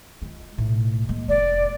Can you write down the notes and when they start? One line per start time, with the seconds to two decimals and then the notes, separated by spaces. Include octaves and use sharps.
0.22 G#3 F4
0.58 B1 A2
1.09 G#3 A#3
1.28 F1 G#3 D5